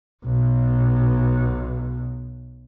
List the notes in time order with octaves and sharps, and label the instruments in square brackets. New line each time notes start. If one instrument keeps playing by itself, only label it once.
[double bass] B1 B2